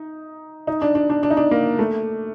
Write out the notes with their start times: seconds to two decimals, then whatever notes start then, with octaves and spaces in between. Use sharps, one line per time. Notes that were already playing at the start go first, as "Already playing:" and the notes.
Already playing: D#4
0.67 D#4
0.82 D4
0.95 D4
1.10 D4
1.23 D4
1.31 D#4
1.37 D4
1.51 A#3
1.79 A3